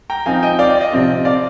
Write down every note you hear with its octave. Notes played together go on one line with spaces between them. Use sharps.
G5 A#5
F3 C4 D#4 F5 G#5
D#5 G5
D5 F5
D5
D#5
C3 F3 C4 F4
D5 F5